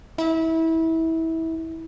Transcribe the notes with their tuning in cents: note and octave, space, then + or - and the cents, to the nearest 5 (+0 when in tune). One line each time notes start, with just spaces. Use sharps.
E4 -25